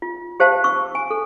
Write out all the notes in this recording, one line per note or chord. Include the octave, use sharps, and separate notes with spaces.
F4
G4 C5 F5 A5
C#6 E6
G#5
A4